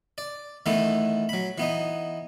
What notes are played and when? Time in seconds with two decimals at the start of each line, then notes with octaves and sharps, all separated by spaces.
0.18 D5
0.66 D#3 E3 A3 B3 A4
1.29 F#3 B5
1.58 E3 B3 D#4